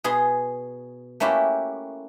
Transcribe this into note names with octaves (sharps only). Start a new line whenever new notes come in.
B2 G#4 C6
A3 A#3 C#4 E4 F#4 G4